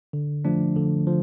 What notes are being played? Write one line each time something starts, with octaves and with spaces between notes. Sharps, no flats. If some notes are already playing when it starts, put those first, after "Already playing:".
D3
F3 A3 D4
D3
F3